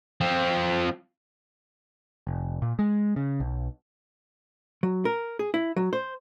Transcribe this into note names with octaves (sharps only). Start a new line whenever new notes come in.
F3 C4
F1
A#2
G#3
C#3
B1
F#3
A#4
G#4
E4
F#3
C5